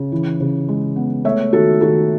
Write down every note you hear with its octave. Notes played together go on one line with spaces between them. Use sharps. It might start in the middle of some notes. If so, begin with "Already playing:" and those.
Already playing: C#3
E3
C#3
G#3
B3
A3 C#5 E5
D#3 F#4 A4
D#3 F#4 A4